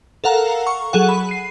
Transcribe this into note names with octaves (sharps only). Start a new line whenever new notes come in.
A4 A#4 F5 F#5 A#5
C#6
F#3 G#4 A4 F#5
B5
C7 D#7